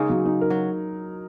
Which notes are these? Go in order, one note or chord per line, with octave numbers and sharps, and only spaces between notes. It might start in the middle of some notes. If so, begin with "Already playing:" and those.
Already playing: C#3 G#3 A#3 D#4
F#3
D#4
A#4
F#3